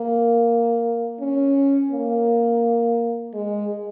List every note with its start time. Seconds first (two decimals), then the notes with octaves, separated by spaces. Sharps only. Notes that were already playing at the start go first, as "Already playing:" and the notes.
Already playing: A#3
1.20 C#4
1.91 A#3
3.34 G#3